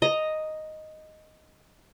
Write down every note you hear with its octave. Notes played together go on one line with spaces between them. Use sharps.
D#5 A#5